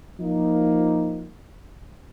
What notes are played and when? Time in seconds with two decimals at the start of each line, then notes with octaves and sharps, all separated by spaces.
0.20 F3 A#3 D#4